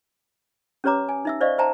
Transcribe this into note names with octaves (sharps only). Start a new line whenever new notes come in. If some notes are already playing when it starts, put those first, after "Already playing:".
C#4 G4 B4 C#5 A#5 D6
G#5
D#4 E5 E6
C5 D5 D#5 F5 C#6
C5 E5 G5 A5 A#5